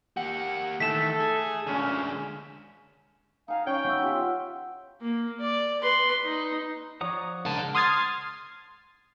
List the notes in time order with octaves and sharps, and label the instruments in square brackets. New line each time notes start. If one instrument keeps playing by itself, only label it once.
[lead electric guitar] A#3 G4 [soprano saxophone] F#5
[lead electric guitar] D#3 E3 [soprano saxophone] A3 [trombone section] A4 [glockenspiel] B6 E7
[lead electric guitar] G#4
[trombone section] D2 A#2 C#4 [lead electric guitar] D3 G#3
[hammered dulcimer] D#4 G#5 A#5 [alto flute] F5
[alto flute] C#4 [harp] C#5 [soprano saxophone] G5
[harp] B3 [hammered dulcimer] F#4 E5
[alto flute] F4 [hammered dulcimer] G4
[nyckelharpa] A#3
D5
B4 C6
D#4
[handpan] F3 C#5 D5 [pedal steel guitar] F#5 A#5 D#6
[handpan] G#3 D4 A#4 [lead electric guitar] F#5 A5
[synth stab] C6 D#6 F6 G#6 A6 C7